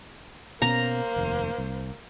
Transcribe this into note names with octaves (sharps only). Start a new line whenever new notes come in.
B2 A#3 B3 C#4 C5 A#5
F1 D#2
C2